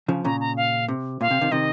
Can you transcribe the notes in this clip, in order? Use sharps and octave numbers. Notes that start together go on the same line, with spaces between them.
C#3 F3
A#2 C#3 A#5
A#5
F5
C3
A#2 F5
C3
C3 D#3
C3 D#3 D#5